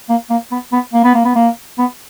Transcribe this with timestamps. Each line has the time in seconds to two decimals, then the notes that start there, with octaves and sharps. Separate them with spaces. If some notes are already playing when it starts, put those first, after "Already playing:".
0.09 A#3
0.30 A#3
0.52 B3
0.72 B3
0.93 A#3
1.04 B3
1.15 A#3
1.25 B3
1.35 A#3
1.79 B3